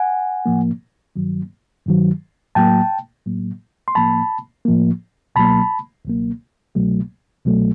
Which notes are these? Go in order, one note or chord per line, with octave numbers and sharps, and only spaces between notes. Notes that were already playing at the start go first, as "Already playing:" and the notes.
Already playing: F#5 G#5
A2 F3 A#3
G2 D#3 F#3
G2 D#3 F#3
A2 F#3 A#3 G5 A5
A2 F#3 A#3
C6
A2 F3 A#3 A5 B5
A2 F3 A#3
C#2 B2 F#3 A#3 A5 B5
C#2 B2 F#3 A#3
C2 B2 F#3 A3
C2 B2 F#3 A3